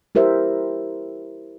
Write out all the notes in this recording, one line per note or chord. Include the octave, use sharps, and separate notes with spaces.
E4 G4 A#4 C5 E5